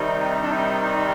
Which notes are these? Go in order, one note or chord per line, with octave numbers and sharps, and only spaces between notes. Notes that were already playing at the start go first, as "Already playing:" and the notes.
Already playing: C3 D#3 G3 C4 D#4
D4
D#4
D#4